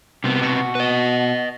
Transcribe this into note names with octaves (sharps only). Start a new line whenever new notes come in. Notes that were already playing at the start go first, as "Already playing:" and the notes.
C2 C3 B3
B2 F#4
B4 D#5